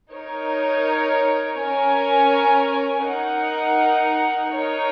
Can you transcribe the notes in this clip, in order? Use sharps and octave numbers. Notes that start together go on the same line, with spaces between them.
D#4 A#4 C#5
C#4 A#4 C#5 G#5
D#4 A#4 F#5
D#4 A#4 C#5